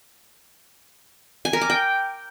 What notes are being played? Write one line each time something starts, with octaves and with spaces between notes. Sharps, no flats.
G#5
A#4
D6
G5